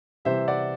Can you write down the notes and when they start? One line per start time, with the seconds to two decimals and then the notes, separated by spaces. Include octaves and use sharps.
0.25 C3 E3 G3 C5 E5
0.48 D5 F#5